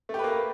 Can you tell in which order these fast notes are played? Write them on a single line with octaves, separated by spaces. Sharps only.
A3 G4 B4 A#3